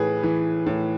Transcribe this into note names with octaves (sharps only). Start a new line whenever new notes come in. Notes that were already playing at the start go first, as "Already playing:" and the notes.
Already playing: A2 E3 G#4 B4
E3
A2